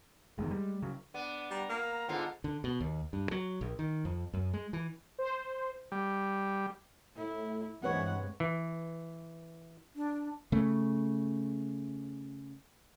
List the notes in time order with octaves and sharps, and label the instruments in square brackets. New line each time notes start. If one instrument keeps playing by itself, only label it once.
[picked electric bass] F#1 E2 D#3 [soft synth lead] G#3
[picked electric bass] G3
C#3 F#3
[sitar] B3 [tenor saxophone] D4 [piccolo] D#7
[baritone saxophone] G3 [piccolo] A#5
[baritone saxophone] A#3
[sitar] G#2 D3 B3 [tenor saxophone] F4
[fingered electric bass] D3
B2
D#2
G2
F#3
A#1
D#3
F2
F#2
G#3
E3
[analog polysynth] C5
[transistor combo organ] G3
[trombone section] A2 [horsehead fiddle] E4
[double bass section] G2 G#3 [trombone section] E3 [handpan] C4 B4 C#5 [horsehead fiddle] F#5
[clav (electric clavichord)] E3
[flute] D4
[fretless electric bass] C#3 A3